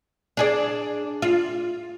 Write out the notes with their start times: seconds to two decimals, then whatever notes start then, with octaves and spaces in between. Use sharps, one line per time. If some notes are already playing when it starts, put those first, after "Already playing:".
0.37 D4 G#4 D5
1.22 F4